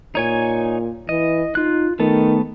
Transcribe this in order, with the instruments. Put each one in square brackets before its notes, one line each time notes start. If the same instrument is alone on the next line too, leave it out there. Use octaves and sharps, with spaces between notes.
[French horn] A#2 [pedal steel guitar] D#4 C#5 G#5
[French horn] E3 [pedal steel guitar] D#5
[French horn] D#4 [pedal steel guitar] F4 F#6
[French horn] D#3 [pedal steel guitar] A3 B3 A4